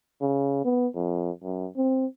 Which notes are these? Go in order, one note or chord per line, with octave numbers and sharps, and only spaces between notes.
C#3
B3
F2
F#2
C4